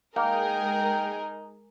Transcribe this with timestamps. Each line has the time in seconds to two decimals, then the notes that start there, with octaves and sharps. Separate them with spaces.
0.16 G#3 A#3 D#4 G#4 A#4 G5